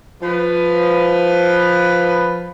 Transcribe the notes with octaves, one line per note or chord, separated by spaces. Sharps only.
F3 B4